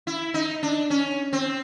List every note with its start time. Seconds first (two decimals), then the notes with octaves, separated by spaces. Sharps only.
0.07 E4
0.34 D#4
0.63 D4
0.90 C#4
1.33 C4